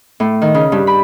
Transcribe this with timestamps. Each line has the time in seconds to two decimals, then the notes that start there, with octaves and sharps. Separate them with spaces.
0.20 A2
0.42 D#3
0.54 C#3
0.72 G2
0.87 B5